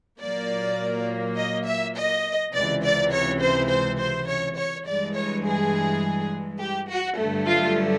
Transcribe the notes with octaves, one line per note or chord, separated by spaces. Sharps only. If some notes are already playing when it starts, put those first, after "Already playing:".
A#2 F#3 A#3 D5
D#5
E5
D#5
C#2 C3 E3 D5
D5
C#5
C5
C5
C5
C#5
C#5
G2 E3 G#3 D5
C#5
G#4
G4
F#4
G2 D3 F#3 A3
F4